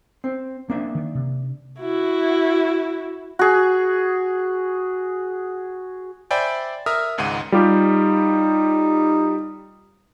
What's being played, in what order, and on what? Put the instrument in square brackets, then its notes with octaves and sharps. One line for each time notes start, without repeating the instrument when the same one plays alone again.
[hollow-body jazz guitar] C4
[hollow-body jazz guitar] A#3 D4 E5 [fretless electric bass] C4
[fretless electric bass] D#3
C3
[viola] E4 F#4
[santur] F#4 G#4
[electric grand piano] C5 D5 E5 G5 G#5 B5
A#4 E5 A#5 D#6 F6
G#1 C#2 G#2 F#5 D#7
[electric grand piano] G3 F4 G4 [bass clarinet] D#4